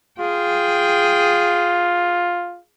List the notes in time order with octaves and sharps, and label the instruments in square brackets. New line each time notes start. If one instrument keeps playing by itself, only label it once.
[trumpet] F4 [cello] G#4 G5